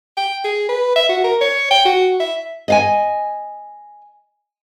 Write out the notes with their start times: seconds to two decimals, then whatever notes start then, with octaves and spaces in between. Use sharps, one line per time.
0.17 G5
0.44 G#4
0.69 B4
0.96 E5
1.09 F#4
1.24 A#4
1.41 C#5
1.71 G5
1.85 F#4
2.20 E5
2.68 D#5 F5 G#5